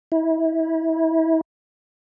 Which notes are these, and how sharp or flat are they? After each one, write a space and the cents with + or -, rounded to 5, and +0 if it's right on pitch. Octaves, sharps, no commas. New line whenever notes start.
E4 -30